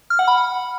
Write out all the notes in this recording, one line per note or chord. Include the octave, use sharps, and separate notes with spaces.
F6
F#5
B5